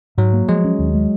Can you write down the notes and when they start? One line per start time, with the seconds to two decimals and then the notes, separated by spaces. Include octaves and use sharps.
0.18 G#2 F#3
0.33 A#3
0.49 F3 G#3
0.65 C#4
0.79 D#2
0.95 G#3